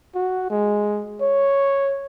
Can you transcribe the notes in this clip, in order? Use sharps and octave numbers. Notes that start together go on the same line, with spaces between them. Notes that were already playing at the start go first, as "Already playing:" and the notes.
F#4
G#3
C#5